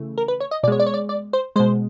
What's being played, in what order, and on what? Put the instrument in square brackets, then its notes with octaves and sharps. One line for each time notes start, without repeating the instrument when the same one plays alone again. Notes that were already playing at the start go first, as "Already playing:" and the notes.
Already playing: [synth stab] C#3 E3 A3
A#4
B4
C#5
D#5
B2 D5
G#3 C#5
D5
C#5
D5
D5
C5
B2 G#3 C5